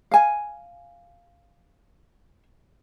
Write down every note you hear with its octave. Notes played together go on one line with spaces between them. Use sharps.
F5 G#5